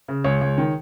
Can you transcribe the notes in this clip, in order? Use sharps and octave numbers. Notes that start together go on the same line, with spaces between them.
C#3
C#2 C#5
C#2
D#3